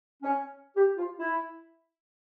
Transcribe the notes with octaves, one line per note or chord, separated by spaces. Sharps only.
C#4
G4
F4
E4